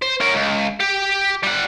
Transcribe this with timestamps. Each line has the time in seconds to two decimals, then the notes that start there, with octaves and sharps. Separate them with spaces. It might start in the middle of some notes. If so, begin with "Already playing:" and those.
0.02 C5
0.21 C#4 A#4
0.34 C#2
0.80 G4
1.43 G3 F#5